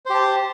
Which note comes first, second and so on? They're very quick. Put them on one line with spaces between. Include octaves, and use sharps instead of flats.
C5 G4 A5